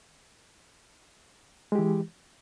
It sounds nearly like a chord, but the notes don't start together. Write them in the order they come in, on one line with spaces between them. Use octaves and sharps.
G#3 G4 E3